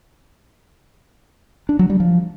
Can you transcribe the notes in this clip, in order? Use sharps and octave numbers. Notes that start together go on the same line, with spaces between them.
D4
F#3
G3
F3